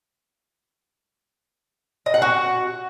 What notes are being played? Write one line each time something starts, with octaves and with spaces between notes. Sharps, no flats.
D#5
F#5
F#4